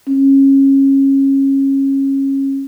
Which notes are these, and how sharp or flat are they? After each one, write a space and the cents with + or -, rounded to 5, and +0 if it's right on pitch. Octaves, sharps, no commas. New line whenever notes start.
C#4 -25